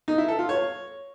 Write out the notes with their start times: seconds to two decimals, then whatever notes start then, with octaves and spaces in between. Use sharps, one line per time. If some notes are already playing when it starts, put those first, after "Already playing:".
0.08 D#4
0.18 E4
0.28 A4
0.39 F4
0.49 C#5